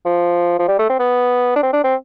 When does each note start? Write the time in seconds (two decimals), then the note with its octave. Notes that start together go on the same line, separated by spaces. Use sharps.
0.05 F3
0.59 F3
0.68 G3
0.79 A3
0.89 C4
0.99 B3
1.56 D4
1.63 C4
1.73 D4
1.84 C4